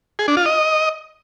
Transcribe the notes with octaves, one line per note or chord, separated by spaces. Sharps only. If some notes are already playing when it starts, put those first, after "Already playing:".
G#4
D4
F4
D#5